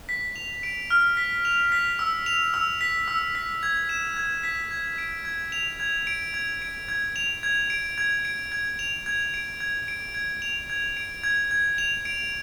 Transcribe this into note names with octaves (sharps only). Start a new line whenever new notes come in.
B6
F7
D7
F6
B6
F7
B6
E6
F7
E6
B6
E6
B6
G#6
E7
G#6
B6
G#6
D7
G#6
F7
G#6
D7
G#6
D7
G#6
F7
G#6
D7
G#6
D7
G#6
F7
G#6
D7
G#6
D7
G#6
F7
G#6
D7
G#6
G#6
F7
D7